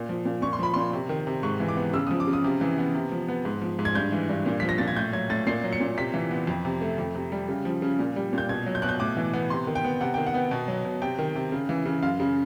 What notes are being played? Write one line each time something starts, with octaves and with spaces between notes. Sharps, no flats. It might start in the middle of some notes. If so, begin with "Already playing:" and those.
Already playing: A#2
F3
A#2
A#2 C#6
C6
F3 B5
A#2 C6
C3
D#3
C3
G#2 C#6
E3
D6
B3
C#3 E6
F3 D#6
D6
C#3
D#6
C3
E3
B3
C3
F3
B3
G#2
F3
G#2
G#6
G2 G6
E3
G2
A#2
F3 B6
A#6
A#2 A6
G#6
A2 G6
F#3 G#6
A2 A6
A#2 C7
F#3
C#7
A#2
C3 B6
E3
B3
F2
C3
A3
F2
C3
G3
C#3
F3
C#3
A#2
G3
A#2 G6
B2 G#6
F#3
G6
B2 F#6
G6
A2 D6
E3
B3
C3 C6
D#3
G5
B3
C3 F#5
D#3 G5
F#5
B3
B2
F#3
B2
C3 G5
D#3
C3
C#3
E3
C#3
F#2 F5
C#3